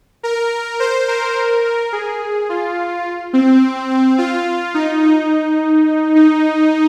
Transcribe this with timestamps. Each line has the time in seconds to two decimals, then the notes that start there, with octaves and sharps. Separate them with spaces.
0.23 A#4
0.80 C5
1.08 A#4
1.65 A#4
1.92 G#4
2.49 F4
3.33 C4
3.90 C4
4.18 F4
4.74 D#4
5.03 D#4
6.15 D#4